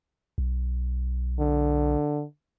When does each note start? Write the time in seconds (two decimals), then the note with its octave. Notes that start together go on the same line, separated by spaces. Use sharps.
0.38 B1
1.39 D3